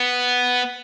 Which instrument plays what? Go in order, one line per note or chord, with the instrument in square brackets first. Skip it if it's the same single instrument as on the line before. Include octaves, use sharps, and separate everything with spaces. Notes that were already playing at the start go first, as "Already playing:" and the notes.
Already playing: [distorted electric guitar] B3